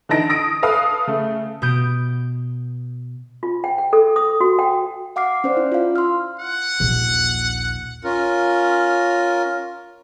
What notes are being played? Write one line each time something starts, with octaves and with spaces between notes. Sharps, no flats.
D3 E3 D#4 A5 A#6 D7
D#6 A#6 D7
A4 B4 F5 D#6
C#3 A3
B2 B3 D#6 G6 D7
F4
G5
G5
A4
D#6
F#4
G5
F5 F#5 D6 F6 C7
C#4 C5 D5
E4
F4 F5
C6 E6 F6
F#5
A#1 D#2
C#4 F4 A#4